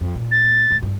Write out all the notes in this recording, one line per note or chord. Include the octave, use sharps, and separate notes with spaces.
F2
A#2
A6
D#2 A2
E2 G2